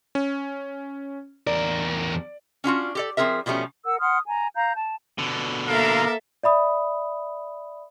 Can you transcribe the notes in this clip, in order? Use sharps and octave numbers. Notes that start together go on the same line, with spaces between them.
C#4
E2 A#4 D5
C#4 D4 F4 F#4
G4 A4 D5
F3 C4 G#4 A#4 E5
B2 F3 G3 A3 C#4
A#4 F#5 E6
F#5 C6 D#6 F6
G#5 A#5
F5 A#5 G6
A5
B2 D3
A#3 A4 A#4 E5 F5
D5 E5 B5 D#6